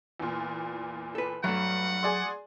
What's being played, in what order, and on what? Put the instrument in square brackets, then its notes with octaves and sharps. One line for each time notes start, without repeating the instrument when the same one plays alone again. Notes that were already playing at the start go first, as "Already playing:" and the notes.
[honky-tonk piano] E2 A#2
[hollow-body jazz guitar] A4 B4
[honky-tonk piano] G2 [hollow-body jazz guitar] F#3 A3 [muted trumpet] F#5
[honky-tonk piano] G#4 D5 C6